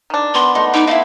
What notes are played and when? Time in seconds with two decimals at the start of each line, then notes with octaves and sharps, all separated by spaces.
0.10 D#3 D4
0.34 B3 C6
0.55 A3 D#4 F#5 A5
0.74 D#4 D6
0.87 D#4 E4 F5